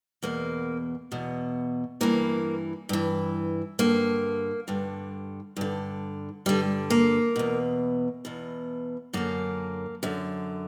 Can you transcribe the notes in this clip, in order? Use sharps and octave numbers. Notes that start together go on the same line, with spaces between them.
E2 B2 A#3
E2 B2
G2 E3 A#3
G2 E3
G2 D3 A#3
G2 D3
G2 D3
G2 D3 G3
A#3
E2 B2
E2 B2
F#2 D3 A#3
F#2 D3